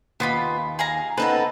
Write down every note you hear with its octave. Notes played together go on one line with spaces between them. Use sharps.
D#2 B3 F4 B5
G#4 F5 A#5
B3 C4 D#4 A4 B4 A5